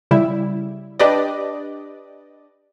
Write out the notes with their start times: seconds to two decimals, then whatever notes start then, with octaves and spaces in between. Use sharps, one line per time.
0.11 C#3 G3 E4
0.99 D4 G4 B4 D5 D#5